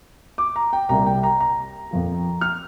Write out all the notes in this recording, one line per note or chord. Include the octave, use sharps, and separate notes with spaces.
D6
A#5
G5
C2 C3 G3 A#3 A#5
G5
A#5
A#5
F2 F3 A#3
F6